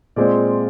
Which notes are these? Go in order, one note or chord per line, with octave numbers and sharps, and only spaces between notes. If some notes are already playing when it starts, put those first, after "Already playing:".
A#2 G#3 C4 D5